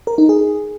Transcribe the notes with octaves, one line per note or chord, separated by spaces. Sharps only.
A#4
D#4
G#4